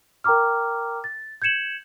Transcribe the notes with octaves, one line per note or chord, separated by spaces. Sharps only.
A#4 G5 A#5 D6 F6
A6
G6 G#6 C#7 E7 F#7